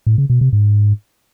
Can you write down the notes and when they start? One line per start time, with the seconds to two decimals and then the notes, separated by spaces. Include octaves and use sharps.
0.07 A2
0.18 C#3
0.30 B2
0.41 C3
0.53 G#2